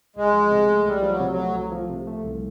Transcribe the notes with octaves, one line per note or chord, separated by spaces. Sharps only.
C2 G#3
F3
C3
A3
C2 G3
F3
F#3
C3
F#3
A3
C2
F3
C3
A3
C2